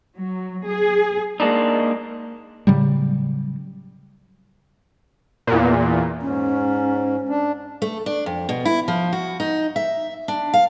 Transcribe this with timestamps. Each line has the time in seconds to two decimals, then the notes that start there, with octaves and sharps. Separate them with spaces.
0.17 F#3
0.66 G#4
1.40 G#3 A#3 D4 D#4
2.67 A2 C#3 F#3 G3
5.47 E2 A#2
6.20 G#2 C#4
7.29 D4
7.82 A3
8.06 D4
8.26 F2
8.49 B2
8.65 E4
8.88 F3
9.13 F#4
9.40 D#4
9.76 E5
10.28 D4
10.54 F5